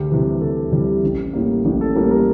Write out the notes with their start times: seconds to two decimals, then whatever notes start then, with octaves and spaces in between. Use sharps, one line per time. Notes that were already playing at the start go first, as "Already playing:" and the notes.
Already playing: D2 G4
0.10 C3 E3 G3
0.41 D2 A4
0.71 C3 E3 G3
1.03 A1
1.33 A2 G3 A#3
1.65 A1
1.81 A4
1.95 A2 G3 A#3 A#4
2.11 A#4